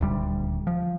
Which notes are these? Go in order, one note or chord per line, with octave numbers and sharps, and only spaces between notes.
D#1 D2 G3
F3